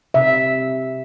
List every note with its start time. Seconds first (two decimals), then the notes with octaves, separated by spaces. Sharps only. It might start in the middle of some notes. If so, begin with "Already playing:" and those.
0.14 C3 E5